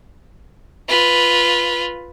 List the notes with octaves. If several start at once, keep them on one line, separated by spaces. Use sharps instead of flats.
F4 B4